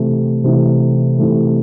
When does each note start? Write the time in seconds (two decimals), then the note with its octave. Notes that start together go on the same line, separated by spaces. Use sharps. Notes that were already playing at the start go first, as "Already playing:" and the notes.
Already playing: C3 E3 A3
0.44 C3 E3 A3
1.19 C3 E3 A3